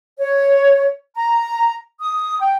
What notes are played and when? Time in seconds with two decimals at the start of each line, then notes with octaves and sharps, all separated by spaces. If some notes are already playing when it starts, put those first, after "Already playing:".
0.19 C#5
1.15 A#5
2.00 D#6
2.40 G5